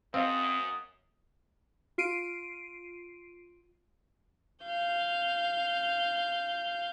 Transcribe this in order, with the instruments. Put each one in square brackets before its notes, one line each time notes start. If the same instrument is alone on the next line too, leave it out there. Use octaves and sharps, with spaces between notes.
[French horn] F#2 [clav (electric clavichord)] C4 [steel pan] D#5 F5 [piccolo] D#6
[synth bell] F4 C7 D7 D#7
[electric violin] F5 G6